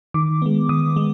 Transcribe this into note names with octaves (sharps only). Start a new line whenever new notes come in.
D#3 D6
G#3 B3
D#3 D#6
G#3